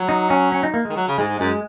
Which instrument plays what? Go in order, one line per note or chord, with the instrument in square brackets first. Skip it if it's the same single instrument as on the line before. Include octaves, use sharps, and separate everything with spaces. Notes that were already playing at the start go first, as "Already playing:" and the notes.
Already playing: [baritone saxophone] F#3
[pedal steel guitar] D#4
C#4
C#4
D#4
A#3
[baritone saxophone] D#3 [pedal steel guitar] G#3
[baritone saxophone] F#3
C#3
[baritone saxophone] G#2 [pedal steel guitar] G#3
[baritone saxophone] G#2
[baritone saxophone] F#2 [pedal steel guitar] G#3